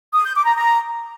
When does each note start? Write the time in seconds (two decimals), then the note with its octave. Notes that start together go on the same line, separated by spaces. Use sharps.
0.14 D#6
0.24 G6
0.35 D6
0.45 A#5
0.56 A#5